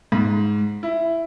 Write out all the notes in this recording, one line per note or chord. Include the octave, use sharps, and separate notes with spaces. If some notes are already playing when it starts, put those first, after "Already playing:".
G#2
E4